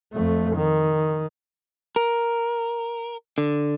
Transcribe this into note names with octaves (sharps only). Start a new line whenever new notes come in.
F2 A3
D#3
A#4
D3